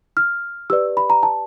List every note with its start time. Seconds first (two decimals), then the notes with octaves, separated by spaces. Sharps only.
0.17 F6
0.70 G4 B4 D5 E6
0.97 B5
1.10 A#5
1.23 A5